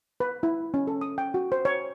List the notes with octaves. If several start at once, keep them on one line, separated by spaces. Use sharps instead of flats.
B4
E4
C#4
A4
D#6
G5
F#4
C5
C#5